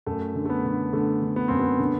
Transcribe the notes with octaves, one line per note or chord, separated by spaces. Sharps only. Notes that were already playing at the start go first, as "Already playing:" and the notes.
F#2 A3
D3
A3
B3
D3
D3 A3
D3
B3
F#2 C4
B3
D3